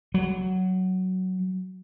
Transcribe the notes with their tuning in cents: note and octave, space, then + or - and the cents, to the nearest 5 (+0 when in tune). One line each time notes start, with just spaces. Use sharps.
F#3 +5